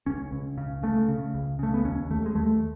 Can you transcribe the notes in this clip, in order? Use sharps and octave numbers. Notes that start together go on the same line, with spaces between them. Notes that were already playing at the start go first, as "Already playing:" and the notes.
C#2 C#4
C#2
C#3
C#3 A3
C#3
C#2
C#3 A3
B3
D#2 C#4
D#2 A3
G#3
D#2 A3